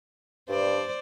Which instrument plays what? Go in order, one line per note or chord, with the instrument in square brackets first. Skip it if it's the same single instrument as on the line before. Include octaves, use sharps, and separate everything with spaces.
[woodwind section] G2 [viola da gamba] C5 D5